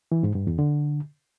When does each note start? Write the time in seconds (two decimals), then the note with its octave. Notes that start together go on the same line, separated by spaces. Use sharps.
0.12 E3
0.23 G#2
0.35 G2
0.47 E2
0.59 D3